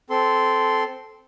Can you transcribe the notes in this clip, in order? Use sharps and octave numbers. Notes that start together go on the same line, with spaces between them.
C4 A4 C6